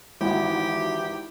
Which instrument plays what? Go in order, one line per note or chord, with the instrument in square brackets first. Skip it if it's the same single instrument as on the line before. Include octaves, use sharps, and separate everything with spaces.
[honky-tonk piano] G#1 F#4 [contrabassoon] E3 [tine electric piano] E4 [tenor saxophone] G4